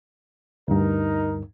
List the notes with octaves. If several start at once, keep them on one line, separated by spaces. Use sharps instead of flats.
D2 G2 D#4 A#4